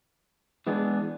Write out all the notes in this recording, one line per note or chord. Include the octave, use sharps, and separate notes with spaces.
E3 G#3 B3 D4 G#4